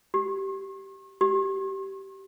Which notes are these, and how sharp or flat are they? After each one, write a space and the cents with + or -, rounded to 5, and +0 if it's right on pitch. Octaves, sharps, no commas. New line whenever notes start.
G4 -15
G4 -20